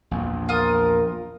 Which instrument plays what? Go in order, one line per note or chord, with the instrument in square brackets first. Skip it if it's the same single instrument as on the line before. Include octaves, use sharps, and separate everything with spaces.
[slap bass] A#1 E2
[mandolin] F4 D#6 [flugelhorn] A#4